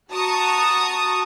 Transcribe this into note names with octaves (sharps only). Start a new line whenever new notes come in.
F#4 A5 A#5 C#6 D#6